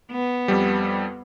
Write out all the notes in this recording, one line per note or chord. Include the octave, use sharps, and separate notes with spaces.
B3
F2 G3